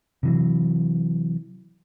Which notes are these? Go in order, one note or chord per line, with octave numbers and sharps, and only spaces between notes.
C3 E3 F#3